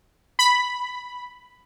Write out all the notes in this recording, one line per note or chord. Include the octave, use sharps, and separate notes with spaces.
B5